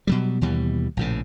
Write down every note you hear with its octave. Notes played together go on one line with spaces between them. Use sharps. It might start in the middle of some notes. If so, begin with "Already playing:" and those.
B2 F#3 G3
D#2 B2 E3 G3
A#1 A2 C#3